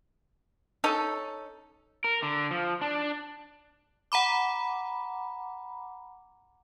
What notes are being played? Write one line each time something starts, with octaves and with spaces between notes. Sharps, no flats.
C#4 D#4 A4
A#4
D3
F3
D4
F#5 A#5 B5 D6